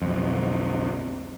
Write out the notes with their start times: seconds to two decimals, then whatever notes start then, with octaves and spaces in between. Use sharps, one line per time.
0.02 B1 F2